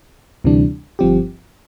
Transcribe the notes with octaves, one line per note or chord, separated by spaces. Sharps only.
D2 C3 E3 G3 D4
G1 G2 F3 C4 G4